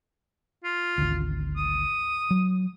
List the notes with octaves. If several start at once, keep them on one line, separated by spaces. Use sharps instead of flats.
F4
G#1 D2
D#6
F#3